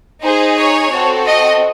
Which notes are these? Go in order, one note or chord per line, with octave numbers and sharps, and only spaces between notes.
D#4 G#4 C5
C#5
C4 F#4 A4
D#5